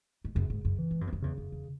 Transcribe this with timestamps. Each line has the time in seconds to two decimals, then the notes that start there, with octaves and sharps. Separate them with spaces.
0.25 G#2
0.35 F#2 C#3
0.50 G#2
0.65 F#2
0.79 E3
0.91 G#2
1.01 F#2
1.07 E2
1.13 F#2
1.22 E2 C#3
1.38 F#2
1.52 E2